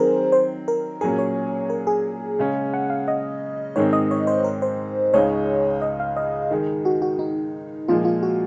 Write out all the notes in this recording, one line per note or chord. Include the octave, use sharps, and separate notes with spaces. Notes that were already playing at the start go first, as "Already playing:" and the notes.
Already playing: D#3 F#3 C4 G#4 A#4 C5
C5
A#4
A#2 F#3 C#4 G#4 A#4
C#5
A#4
G#4
C#3 G#3 C#4
F#5
F5
D#5
G#2 D#3 G#3 C4 D#4 C#5
D#5
C#5
C5
A#4
C5
C#2 C#3 G#3 D#4 C#5
D#5
F5
D#5
D#3 G#3 D#4
F#4
F#4
D#4
A#2 F3 G#3 F4
F4
F#4